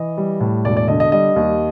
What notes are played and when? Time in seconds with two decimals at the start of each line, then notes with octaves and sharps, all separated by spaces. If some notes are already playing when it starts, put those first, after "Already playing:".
Already playing: E3 D#5
0.17 G3
0.40 A2
0.65 E1 D5
0.77 D5
0.88 D3 D#5
1.00 D#5
1.12 G3 D#5
1.36 D#2